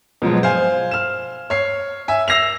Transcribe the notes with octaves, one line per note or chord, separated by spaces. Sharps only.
B2 F3 F#3 G#3
C5 F5 G#5
F6 E7
C#5 C7
E5 G#5
E6 A#6 C7 F7